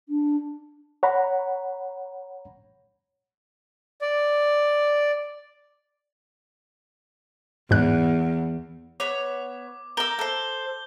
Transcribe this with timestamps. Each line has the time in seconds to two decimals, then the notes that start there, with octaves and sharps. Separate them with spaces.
0.08 D4
1.03 C#5 F#5 A#5 B5
4.02 D5
7.71 E2 G#2 F#6
9.00 B3 C#5 D6
9.97 A#4 E6 G6 G7
10.19 A4 C5